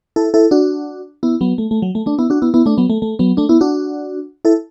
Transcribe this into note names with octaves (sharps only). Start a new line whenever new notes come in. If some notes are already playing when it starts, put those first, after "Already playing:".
E4 A4
E4 A4
D4 F#4
B3 E4
F#3 B3
A3
A3
F#3
A3
A3 D4
B3 E4
D4 F#4
B3 E4
B3 E4
A3 D4
F#3 B3
A3
A3
F#3 B3
A3 D4
B3 E4
D4 F#4
E4 A4